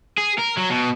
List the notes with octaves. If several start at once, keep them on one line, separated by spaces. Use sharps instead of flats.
G#4
A#4
F#3
B2